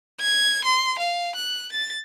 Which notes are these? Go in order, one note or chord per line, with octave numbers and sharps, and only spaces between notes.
G#6
C6
F5
F#6
A6